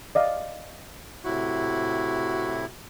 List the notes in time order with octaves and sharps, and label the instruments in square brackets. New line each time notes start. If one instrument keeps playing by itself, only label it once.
[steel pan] D5 D#5 F5
[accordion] A2 C3 E4 [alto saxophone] F#4